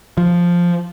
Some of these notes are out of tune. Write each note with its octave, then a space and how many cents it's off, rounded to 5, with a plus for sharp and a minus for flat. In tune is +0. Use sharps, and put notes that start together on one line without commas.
F3 +0